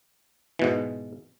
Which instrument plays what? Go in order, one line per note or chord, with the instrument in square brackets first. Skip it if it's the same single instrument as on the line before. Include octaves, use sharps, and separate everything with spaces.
[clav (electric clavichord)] G#2 B2 E3